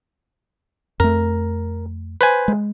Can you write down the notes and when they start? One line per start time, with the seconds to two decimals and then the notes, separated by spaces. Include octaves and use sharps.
1.00 F2 A3 A#4
2.21 B4 C5 G#5
2.48 G#3